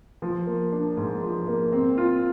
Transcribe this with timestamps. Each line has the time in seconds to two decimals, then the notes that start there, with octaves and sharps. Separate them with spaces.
0.22 F3
0.47 A#3
0.72 D4
0.97 G#2
1.22 F3
1.47 A#3
1.72 C4
1.98 F4